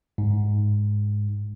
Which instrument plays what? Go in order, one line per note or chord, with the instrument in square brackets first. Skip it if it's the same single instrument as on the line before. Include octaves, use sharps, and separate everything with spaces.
[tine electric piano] G#2